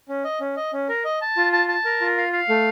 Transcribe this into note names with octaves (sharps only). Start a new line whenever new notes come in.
C#4
D#5
C#4
D#5
C#4
A#4
D#5
A5
F4
A5
A5
A#4
F4
F5
F5
A3